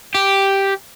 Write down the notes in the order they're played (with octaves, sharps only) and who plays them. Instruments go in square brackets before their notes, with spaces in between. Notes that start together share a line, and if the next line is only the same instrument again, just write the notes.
[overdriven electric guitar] G4